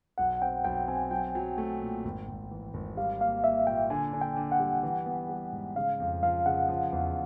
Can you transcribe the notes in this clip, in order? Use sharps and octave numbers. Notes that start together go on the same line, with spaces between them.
B1 F#5
C4 G5
B1 G5
C4 G#5
F#3 G5
F#3
A3
A#2
G#1
G#1
E3
G#1
G3 F5
A#3 F5
A#3 E5
A#2 G5
D3 G#5
D3
G5
D3
F#5
G3
E3
B3
G3
G#2
C#3 F5
F2
F3 F5
C#3 F#5
F3
E2